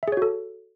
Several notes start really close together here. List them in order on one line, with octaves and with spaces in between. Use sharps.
E5 G#4 C#5 F#4 A4